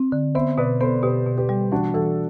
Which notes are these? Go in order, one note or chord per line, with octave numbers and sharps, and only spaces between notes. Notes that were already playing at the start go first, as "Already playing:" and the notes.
Already playing: C4
D3
B3 C5 E5
B2 B4 D5
B3 A4 C5
B2 G4 B4
B2
G4 B4
G3
E3 D4 F#4
E3 F#4 A4